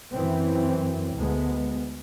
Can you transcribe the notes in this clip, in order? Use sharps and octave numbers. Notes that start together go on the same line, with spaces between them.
F#2 E3 C4
D2 G#3 B3